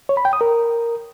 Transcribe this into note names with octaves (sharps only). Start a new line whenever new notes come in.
C#5
B5
G5
D#6
A#4